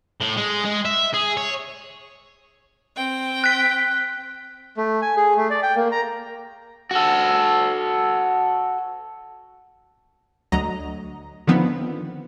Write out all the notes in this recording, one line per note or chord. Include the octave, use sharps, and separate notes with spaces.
A2
G#3
G#3
E5
G#4
C#5
C4 G5
F#6 B6
A3
G#5
G#4
A3
D5
G5
A#3
A#5
F#4 A4
D2 F#3 D#5 A#5
D3 D#3 F3 B3 C4